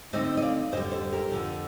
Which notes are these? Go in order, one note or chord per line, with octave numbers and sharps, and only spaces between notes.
D3 A3 C4 D#4 C5 D#5
D#5
D5 F5
F2 D3 G3 C5 D#5
A4 C5
G4 A#4
F2 D3 F3